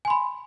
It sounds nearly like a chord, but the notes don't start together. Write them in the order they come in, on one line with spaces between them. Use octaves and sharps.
G#5 C6 B5